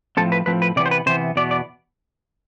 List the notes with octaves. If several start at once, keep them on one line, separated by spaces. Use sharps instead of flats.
A2 F3 C4 A4
B4
A2 F3 C4 B4
B4
C3 E3 B3 D5
C5
B4
C3 E3 B3 C5
E2 B2 B3 D5
D5